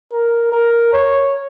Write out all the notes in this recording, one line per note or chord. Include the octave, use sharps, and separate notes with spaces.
A#4
A#4
C#5